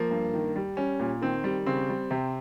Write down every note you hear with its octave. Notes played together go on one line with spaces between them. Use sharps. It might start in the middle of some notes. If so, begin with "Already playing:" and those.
Already playing: F3 A#3
G2
D#3
G3
G3 C#4
A#2
D#3 C4
G3
C#3 C4
G3
C3